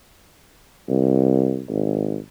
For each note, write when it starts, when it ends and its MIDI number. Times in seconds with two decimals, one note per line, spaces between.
0.89 1.62 36
1.69 2.18 32